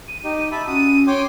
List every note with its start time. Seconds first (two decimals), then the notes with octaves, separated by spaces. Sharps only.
0.08 D#7
0.24 D#4 G4
0.52 E5 A5 B5
0.67 C#4 F#4 D#6 D#7
1.07 C#5 G5 C6 D6